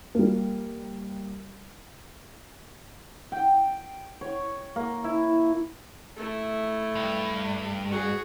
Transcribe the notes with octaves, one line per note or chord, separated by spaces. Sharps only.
G3 A#3
G5
C#5
A#3
E4
A3 E4
G2
F#4 G#4